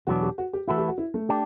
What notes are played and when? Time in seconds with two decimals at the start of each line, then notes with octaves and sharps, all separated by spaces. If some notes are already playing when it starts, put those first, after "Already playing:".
0.07 E2 B2 F#3 B3 D4 F#4
0.23 G4
0.38 F#4
0.53 G4
0.68 E3 A3 E4 F#4
0.78 G4
0.88 F#4
0.98 E4
1.14 A3
1.29 D4 G4